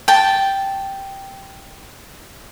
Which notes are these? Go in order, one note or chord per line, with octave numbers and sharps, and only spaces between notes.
G5 A5